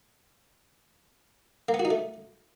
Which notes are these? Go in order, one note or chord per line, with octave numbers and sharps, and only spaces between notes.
A#3
B3
F#4
D#4
A3